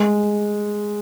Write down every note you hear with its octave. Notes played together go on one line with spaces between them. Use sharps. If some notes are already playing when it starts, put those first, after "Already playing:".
Already playing: G#3